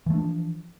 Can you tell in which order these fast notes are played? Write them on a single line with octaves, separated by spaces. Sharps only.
E3 A3 D4 F3